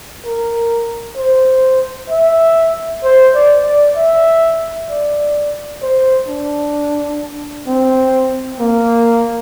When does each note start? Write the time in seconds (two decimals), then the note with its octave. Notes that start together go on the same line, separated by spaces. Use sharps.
0.25 A#4
1.17 C5
2.10 E5
3.04 C5
3.34 D5
3.65 D5
3.96 E5
4.89 D5
5.82 C5
6.28 D4
7.67 C4
8.60 A#3